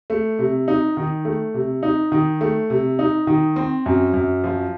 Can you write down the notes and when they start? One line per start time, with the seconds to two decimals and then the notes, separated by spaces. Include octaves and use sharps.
0.10 A3
0.39 C3
0.68 D#4
0.97 D#3
1.25 A3
1.54 C3
1.83 D#4
2.12 D#3
2.41 A3
2.70 C3
2.99 D#4
3.27 D#3
3.56 C4
3.86 F#2
4.14 F#2
4.44 F3